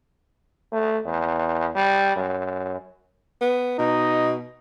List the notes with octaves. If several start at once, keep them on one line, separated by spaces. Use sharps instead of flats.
A3
E2
G3
F#2
B3
B2 D#4